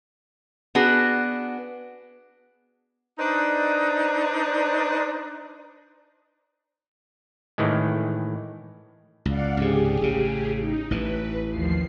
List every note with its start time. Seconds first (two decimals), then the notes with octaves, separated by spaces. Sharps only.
0.75 B3 D4 F#4 G#4
3.19 D4 D#4 B4 C5 D5 D#5
7.58 A2 D#3 E3 G#3
9.25 C#2 D5 F5 F#5
9.57 C#2 G#2 C3 G4 G#4
10.01 A1 C#3
10.61 D#4
10.91 A1 E3 B4
11.50 D#2 F3 C7